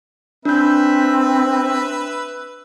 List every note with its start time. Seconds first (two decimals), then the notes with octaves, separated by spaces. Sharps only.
0.45 C4 D4 B4 E5 G6